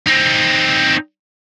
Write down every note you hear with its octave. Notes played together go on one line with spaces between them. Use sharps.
C4 D#4